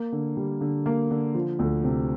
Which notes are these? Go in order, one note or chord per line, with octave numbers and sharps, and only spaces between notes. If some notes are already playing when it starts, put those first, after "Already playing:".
Already playing: A#3
D3
G3
D3
A#3
D3
F3
D2
C3